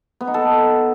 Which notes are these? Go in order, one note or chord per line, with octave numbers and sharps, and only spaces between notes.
B3
D#4
A4